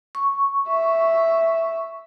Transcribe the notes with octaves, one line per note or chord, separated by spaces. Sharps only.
C#6
E5